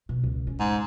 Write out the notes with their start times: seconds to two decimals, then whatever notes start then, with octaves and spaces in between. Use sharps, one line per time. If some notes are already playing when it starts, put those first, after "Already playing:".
0.09 B2
0.24 C#2
0.47 C#4
0.59 G#2